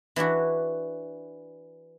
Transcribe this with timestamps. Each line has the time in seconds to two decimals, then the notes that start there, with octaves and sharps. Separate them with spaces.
0.16 E3 D4 E4 F#4